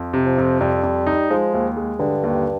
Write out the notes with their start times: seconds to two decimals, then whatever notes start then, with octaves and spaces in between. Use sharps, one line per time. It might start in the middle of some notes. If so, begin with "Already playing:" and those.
Already playing: F2
0.13 C3
0.26 F3
0.38 F2
0.61 F2 G3
0.83 F2
1.07 D#4
1.30 F3 G#3
1.54 D#2
1.77 G#3
1.99 G2 D3
2.24 D#2